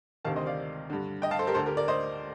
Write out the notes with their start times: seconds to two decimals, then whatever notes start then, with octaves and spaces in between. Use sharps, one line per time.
0.25 D2 C3 D#3 F5 A5
0.36 C5 D#5
0.46 D5 F5
0.90 G2 D3
1.22 D#5 G5
1.31 F5 A5
1.39 A4 C5
1.47 G4 A#4
1.55 D2 D3 A4 C5
1.66 G4 A#4
1.77 A#4 D5
1.88 C5 D#5